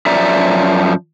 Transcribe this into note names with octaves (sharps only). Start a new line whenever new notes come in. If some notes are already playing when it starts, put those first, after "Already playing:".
F#2 F3 D5 E5 A#5